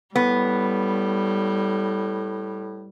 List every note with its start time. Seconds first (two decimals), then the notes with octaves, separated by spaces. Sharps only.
0.16 A2 G3 B3